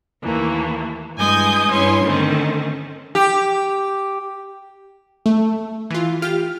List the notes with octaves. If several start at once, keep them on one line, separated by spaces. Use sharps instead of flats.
D#2 E3 A3 A#3
G2 E3 G#3 G#5 D#6 G6
G2 C#4 E4 C#5 G#5 C6
D3 D#3 A3 C4 C#4
G4
A3
E3 F4
F4 G4 F6